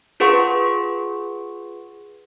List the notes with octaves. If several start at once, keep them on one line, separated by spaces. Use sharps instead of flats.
F4 G#4 B4 F#5 C6 C#6